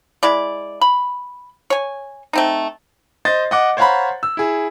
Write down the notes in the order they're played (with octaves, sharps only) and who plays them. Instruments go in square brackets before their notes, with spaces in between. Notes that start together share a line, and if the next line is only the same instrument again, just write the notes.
[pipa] G#3 E4 D5
B5
C#5 G#5
A3 C4 D#4
[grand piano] C5 D#5 A6
D#5 F#5 D6
C5 C#5 F5 F#5 A#5 B5
E6
E4 G#4